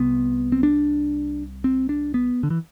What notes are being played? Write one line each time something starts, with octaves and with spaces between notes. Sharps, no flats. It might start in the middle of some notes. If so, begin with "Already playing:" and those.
Already playing: C2 C3 B3
C4
D4
C4
D4
B3
D3
E3